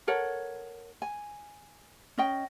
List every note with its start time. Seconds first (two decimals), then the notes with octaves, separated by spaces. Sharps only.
0.07 A4 A#4 C#5 F#5
1.02 G#5
2.18 C#4 D#5 G5